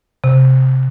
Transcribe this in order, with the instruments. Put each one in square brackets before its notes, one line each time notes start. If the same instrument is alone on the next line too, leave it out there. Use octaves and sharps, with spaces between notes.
[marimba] C3